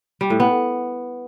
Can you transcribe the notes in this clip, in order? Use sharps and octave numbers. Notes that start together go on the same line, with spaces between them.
G3
A2
B3